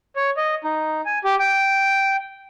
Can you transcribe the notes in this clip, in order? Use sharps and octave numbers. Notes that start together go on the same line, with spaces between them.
C#5
D#5
D#4
G#5
G4
G5